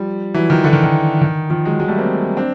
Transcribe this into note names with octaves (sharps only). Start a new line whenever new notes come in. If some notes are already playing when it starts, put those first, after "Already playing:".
Already playing: F3 G3
E3 F#3
D#3 F3
D3 E3
D#3
D#3
D#3
D#3 F3
F#3 G#3
F#3 G#3
G3 A3
A#3 C4
C4 D4